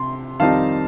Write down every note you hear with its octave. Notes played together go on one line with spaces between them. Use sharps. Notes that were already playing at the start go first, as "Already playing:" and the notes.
Already playing: C3 C6
F2 D#3 G3 C4 D#4 F5 A5